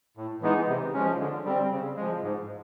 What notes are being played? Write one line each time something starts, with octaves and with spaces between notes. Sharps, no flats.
A2
E3 G#3 B3 D#4
C3
F3 G#3 C#4
D3
G3 C4
C#3
F3 G#3
G#2